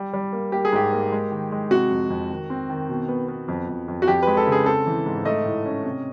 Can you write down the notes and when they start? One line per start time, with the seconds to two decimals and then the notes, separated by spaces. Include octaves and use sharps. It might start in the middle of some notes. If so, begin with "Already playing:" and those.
Already playing: G3
0.13 G3
0.33 A#3
0.52 A#3 G4
0.65 G#4
0.72 G#2 G4
0.93 A#3
1.12 G#3
1.31 D#3
1.52 G#3
1.71 C3 F#4
1.91 F2
2.10 F2
2.30 D#3
2.50 C4
2.69 D#3
2.89 B2
3.08 B3
3.28 B3
3.48 F2
3.68 F2
3.88 F2
4.02 F#4
4.08 F2 G4
4.23 G#3 B4
4.37 A4
4.47 C#3
4.52 G#4
4.66 C4 A4
4.87 E3
5.06 G#2
5.25 A3 D#5
5.45 A2
5.65 C#4
5.84 C3